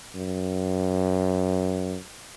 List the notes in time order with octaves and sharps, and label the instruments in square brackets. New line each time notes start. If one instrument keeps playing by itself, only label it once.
[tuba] F#2